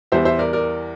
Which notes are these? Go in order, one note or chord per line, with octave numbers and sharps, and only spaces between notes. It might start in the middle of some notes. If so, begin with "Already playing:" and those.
E2 E3 G3 C5 E5
C5 E5
A#4 D5
A#4 D5